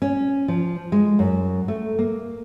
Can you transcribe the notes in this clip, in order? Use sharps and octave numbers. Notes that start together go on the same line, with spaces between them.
C#4
F3
G#3
F#2
A3
A#3